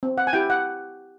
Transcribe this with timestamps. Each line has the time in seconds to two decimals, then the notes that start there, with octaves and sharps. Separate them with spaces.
0.03 C4
0.18 F#5
0.27 G#5
0.33 E4 G4 G5
0.50 F#5